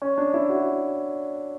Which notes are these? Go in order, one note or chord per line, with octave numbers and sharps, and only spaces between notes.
C#4
D4
E4
F#4